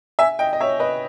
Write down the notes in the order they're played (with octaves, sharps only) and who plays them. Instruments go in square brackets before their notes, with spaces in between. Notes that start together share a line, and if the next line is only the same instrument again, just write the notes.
[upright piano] E5 G#5
D#5 G5
D#5
C#5 E5
B4 D#5